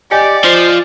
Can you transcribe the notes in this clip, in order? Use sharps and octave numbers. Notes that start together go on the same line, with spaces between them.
G4 D5 D#5 G#5 C#7
F3 C5